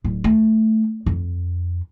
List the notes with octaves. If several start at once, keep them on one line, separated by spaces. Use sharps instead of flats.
D1
A3
F2